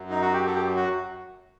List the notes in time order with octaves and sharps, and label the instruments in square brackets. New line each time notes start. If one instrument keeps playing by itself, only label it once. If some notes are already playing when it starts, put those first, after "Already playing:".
Already playing: [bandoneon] F#2 F#3
D#4
F#4
G4
A4
G4
F#4